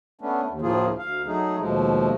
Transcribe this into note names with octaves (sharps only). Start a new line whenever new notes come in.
A3 B3 C#4 D4
D#2
D2 A2 F3 A#3 F4 G#4
D2 F5
F#3 A3 D#4 G#4
D#2 B2 F3 G#3 A3